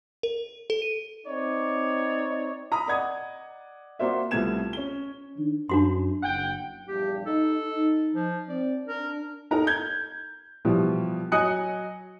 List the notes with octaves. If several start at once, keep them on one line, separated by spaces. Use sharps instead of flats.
A#4
A4
D#7
C4 D#4 C#5 D5
A#5 B5 D#6
D5 D#5 F#5 D#6 G#6
A#3 F4 F#4 C5 D5 E5
C2 F3 A3 B3 G#6 E7
C#4 G7
D#3 D4
F#2 D4 F#4 C6
F#1 F#5 G5
A#1 E2 G2 G4
D#4 A4
D#4
F3
C4 D5
D4 A#4
D#4 A4 A#4 A#5
G6 G#6
B2 E3 F3 G3
F#3 D#5 G#5 D#6 F#6 C#7